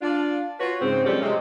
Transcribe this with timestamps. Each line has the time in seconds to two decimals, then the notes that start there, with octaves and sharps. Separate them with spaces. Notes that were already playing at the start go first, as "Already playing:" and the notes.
0.02 D4 F4
0.60 F4 F#4 B4 C#5
0.81 G#2 C#3 C4
1.05 B2 F3 G3 A3 C#4 G4
1.22 C3 G#3